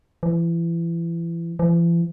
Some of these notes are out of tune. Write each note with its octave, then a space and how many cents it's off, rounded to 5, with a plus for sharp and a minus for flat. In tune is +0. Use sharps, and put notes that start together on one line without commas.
E3 +30
E3 +45